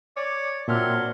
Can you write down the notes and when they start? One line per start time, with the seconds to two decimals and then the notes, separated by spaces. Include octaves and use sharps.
0.17 C#5 D5 D6
0.68 A#2 F#3 C4 D4 E5 F6